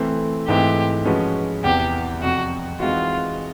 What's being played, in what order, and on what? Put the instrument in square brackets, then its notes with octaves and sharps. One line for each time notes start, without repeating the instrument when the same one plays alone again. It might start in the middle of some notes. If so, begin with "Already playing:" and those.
Already playing: [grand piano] E3 A3 C4
[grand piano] G#2 E3 A3 C4 E4 [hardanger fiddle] G4
[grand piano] F3 G#3 C#4 F#4 B4
[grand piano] E2 C3 E3 [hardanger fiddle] G4
[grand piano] F2 C3 F3 [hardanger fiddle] F#4
[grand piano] E3 G#3 C4 D#4 F#4 [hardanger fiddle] F4